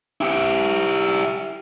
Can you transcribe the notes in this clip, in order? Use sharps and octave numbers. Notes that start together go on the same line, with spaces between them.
E4 G4